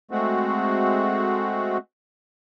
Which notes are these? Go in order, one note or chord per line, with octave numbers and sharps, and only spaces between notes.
G#3 A3 C4 F#4